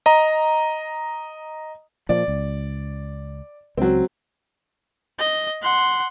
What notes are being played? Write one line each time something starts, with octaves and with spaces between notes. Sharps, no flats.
D#5 A#5
A#2 F3 D5
C#2
C#2 F#3 C4
D#5
F#5 C6